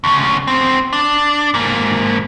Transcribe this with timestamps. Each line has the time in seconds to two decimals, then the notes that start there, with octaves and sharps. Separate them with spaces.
0.04 D2 C#3
0.47 F#2 C4
0.93 D4
1.54 G#2 A#3